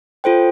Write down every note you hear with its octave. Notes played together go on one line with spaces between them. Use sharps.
F4 A4 C5 G5